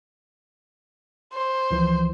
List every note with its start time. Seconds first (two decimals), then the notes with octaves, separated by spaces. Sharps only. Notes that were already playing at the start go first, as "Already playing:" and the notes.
1.33 C5
1.71 C#2 E3 F3